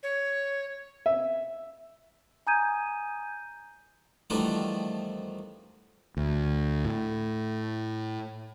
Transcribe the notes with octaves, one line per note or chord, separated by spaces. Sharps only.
C#5
E5
G#5 A#5 D#6 G6 G#6 D#7
E2 D#3 F3 G3 A3 D4
D2
A2